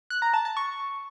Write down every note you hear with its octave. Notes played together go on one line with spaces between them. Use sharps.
F#6
A#5
A5
A5
C#6